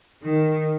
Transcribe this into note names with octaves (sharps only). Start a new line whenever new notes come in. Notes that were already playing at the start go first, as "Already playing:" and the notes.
D#3